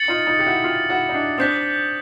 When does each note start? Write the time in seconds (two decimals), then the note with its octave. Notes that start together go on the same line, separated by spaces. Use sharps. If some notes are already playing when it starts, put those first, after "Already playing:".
Already playing: A6 C#7 F#7
0.08 D#4 F4
0.27 D#4 F4
0.39 G4
0.46 E4 F#4
0.64 F4 G4
0.89 E4 F#4
1.09 D#4
1.14 D4 E4
1.38 C4 D4 D#6 G6 B6